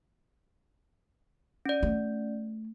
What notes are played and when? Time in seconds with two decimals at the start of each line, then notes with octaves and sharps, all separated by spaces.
1.66 C#4 D5
1.83 A3